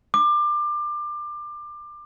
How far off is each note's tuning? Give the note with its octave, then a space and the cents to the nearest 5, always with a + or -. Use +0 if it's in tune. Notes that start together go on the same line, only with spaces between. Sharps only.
D6 +25